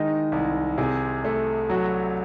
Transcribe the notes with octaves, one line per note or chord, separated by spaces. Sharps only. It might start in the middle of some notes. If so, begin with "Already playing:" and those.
Already playing: D#3 G#3 D#5
C2
C3 G#4
A3
F#3 F#4